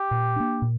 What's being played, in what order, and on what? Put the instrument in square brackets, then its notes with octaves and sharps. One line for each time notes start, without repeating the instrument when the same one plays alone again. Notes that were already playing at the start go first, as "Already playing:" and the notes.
Already playing: [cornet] G4
[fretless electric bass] A#2
A#3 D4
A#2